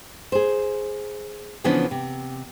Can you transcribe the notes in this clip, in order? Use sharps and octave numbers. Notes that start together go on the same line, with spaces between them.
G#4 C5
C#3 E3 F3 B3 C#4 D4
C3